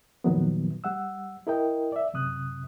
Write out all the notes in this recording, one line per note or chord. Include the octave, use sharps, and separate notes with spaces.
F2 A#2 D#3 F#3 B3
G3 F#5 E6
E4 A#4 D#5 G5
D5 E5
F#2 C3 D#6 F#6